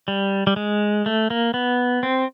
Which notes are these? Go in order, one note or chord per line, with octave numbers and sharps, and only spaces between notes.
G3
G3
G#3
A3
A#3
B3
C4